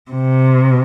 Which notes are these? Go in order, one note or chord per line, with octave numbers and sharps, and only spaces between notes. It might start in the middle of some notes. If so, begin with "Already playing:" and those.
C3